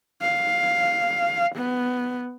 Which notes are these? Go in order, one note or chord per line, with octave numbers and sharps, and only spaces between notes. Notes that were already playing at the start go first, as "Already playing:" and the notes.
F5
B3